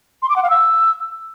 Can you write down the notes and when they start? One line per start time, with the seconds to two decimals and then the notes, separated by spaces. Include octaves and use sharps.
0.22 C6
0.29 D6
0.36 F#5
0.43 F5
0.50 E6